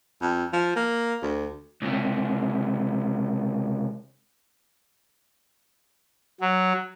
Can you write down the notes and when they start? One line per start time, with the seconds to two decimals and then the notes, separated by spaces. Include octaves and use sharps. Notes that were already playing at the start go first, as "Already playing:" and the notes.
0.22 F2
0.53 F3
0.76 A#3
1.22 D2
1.82 C#2 C3
6.41 F#3